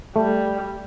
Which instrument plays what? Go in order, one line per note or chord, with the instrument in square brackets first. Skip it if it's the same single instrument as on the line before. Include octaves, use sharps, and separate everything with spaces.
[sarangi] G3 [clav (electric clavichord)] A3